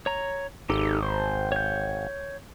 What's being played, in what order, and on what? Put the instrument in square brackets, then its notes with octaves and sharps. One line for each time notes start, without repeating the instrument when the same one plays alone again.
[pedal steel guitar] C#5 A#5
[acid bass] G#1 [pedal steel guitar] D#4 G4 A4
[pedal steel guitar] C5
C#5 G6